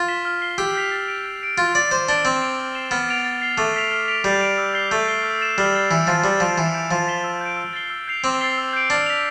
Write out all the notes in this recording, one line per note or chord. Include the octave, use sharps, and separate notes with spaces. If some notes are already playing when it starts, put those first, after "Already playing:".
Already playing: F4
B6 E7 G7
F6
C7 G7
G4 E6
G6 B6 F7
A6
D7 F7
G6
B6 D7 F7
F4 E6
D5 A6 D7 F7
C5 D6
D4 G6 D7 G7
C4 A6
D7 F7
F6
C7 E7 G7
B3 F6
A6 D7 F7
A6
C7 G7
A3 D6
F6 B6 F7
F6
B6 D7 F7
G3 G6
D7 F7
E6
G6 C7 G7
A3 G6
C7 G7
E6
A6 E7
G3 F6
A6 C7 E7
E3 F6
F3 A6 C7
G3 E6
F3 A6 D7 F7
E3 E6
G6 D7 F7
F3 E6
B6 E7 G7
E6
G6 D7
E6
A6 C7 G7
E6
G6 C7 F7
C4 D6
A6 C7 G7
E6
G6 D7
D4 F6
B6 F7